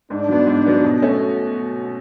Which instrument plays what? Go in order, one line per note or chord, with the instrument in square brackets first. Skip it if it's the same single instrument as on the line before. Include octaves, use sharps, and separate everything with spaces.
[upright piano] G#2 [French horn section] D4
[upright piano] F#3 B3
G#2
F#3 B3
B2
A3 C#4